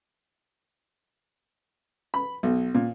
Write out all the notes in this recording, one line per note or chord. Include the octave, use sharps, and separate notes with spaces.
B5
B1
A#2